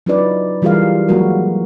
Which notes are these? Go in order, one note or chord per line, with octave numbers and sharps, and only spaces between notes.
F#3 C#4 D#4 F4 B4 D5
E3 G3 F4 G#4 A#4 F5
F3 F#3 G#3 A#3 F#4 A#4